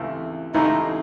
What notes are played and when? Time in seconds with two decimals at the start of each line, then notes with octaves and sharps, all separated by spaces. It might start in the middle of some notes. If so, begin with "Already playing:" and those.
Already playing: C#2 C3 E3 A3
0.54 C#2 C3 E3 A3 D#4